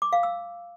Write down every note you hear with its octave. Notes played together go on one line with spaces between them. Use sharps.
D6
F5
E6